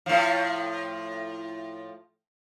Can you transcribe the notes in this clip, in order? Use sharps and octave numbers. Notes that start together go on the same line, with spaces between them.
A2 F3